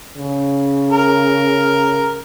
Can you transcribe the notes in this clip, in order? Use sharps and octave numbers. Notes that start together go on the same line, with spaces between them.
C#3
A#4